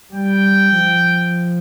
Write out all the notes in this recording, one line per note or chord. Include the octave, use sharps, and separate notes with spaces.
G3 G5
F3